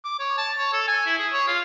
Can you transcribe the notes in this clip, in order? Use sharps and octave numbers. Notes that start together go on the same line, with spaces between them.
D6
C#5
A5
C#5
A4
G#5
E4
G#4
C#5
F4